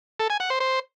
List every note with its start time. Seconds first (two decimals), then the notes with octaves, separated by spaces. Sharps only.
0.20 A4
0.30 G#5
0.40 F#5
0.50 C5
0.60 C5